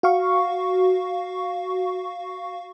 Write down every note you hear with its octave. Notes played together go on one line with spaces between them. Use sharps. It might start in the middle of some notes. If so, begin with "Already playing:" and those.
F#4 F5 C#6